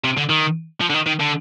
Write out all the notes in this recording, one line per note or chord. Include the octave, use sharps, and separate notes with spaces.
C3
D3
D#3
F3
D3
D#3
D#3
D3